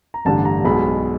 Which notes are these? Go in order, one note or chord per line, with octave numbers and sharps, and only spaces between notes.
A#5
A1 G2 D3 G3 A5
A#5
B1 B2 G#3 B5